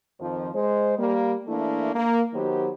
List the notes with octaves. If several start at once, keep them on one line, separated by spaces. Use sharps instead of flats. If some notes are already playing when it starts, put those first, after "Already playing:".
F2 D#3 F3
G#3 C5
G3 A#3
E3 A3 A#3 D4 E4
A#3
D#3 F#3 B3 G4 C5